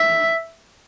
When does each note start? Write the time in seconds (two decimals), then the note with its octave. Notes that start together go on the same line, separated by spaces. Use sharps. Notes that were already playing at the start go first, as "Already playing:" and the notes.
Already playing: E5